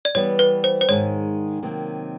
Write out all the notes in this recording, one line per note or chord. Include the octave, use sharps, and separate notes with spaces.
D5
E3 G3 B3 C#5
B4
C5
C5
G#2 D#3 G#3 C#5
C3 D#3 F#3 A#3